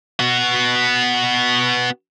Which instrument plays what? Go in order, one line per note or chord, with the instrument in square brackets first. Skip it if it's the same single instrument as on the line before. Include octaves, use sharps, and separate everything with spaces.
[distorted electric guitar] B3 F#4